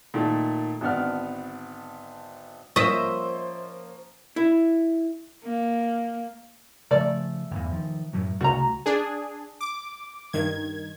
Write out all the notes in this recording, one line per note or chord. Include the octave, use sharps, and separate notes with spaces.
A#2 D#3 A3
G#1 D3 B3 D5 F6
F3 A#3 C#4 C5 D#5 E5 C#6
E4
A#3
C#3 F3 A3 D5
G1 E2
D#3 F3
F#2 A2 F#3
C2 C#3 A3 F#4 A#5
D4 G#4
D6
G2 D#3 G#6